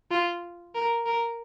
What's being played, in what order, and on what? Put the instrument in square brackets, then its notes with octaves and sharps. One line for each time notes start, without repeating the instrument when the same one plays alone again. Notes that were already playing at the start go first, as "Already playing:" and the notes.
[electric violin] F4
A#4
A#4